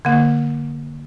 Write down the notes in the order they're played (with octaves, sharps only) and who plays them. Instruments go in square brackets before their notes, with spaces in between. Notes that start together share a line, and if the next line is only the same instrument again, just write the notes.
[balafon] D3 A#3